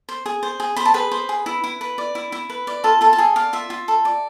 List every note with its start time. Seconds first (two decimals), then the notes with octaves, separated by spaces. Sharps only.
0.09 C5
0.26 G#4
0.43 C5
0.60 G#4
0.76 C5 B5
0.85 A5
0.94 G#4 B4 B5
1.12 C5
1.29 G#4
1.46 E4
1.64 E4
1.81 B4
1.98 D5
2.15 E4
2.32 E4
2.50 B4
2.67 D5
2.84 F4 A4 A5
3.01 F4 A4 A5
3.13 A5
3.18 G#4 A4 G#5
3.36 D5 F5
3.53 F4 E5
3.70 F4
3.88 A4
4.05 D5